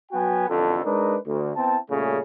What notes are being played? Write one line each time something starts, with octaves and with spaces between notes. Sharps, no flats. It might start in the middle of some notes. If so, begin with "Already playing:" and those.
F#3 B3 F#4 G5 G#5
A1 F2 D3 F3 A4
G#3 D4 D#4 A#4 B4
D2
B3 C4 E4 G5 A5
A#2 C#3 G3 A3 C#4 G#4